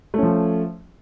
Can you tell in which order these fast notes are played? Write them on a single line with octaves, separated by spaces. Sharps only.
A3 C#4 F3